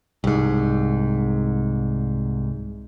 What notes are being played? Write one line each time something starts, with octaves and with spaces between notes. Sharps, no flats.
C2 G#2